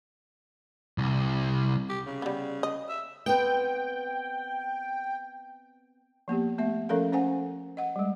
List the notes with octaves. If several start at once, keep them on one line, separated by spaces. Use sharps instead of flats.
C2
G4
C#3
G3 B3
D#5
E5
B3 C4 B4 G5
F3 A#3 B3 G4
A3 B3 E5
F3 C#4 A4 A#4 F5
C#4 C5 F#5 G#5
D#5 F#5
G3 G#3